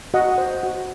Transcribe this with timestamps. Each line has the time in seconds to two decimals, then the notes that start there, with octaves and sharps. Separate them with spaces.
0.14 F#4 D#5 F#5
0.38 C5
0.63 F#4